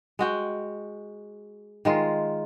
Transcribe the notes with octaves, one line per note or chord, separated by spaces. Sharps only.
G#3 F#4 G5
D#3 G#3 F4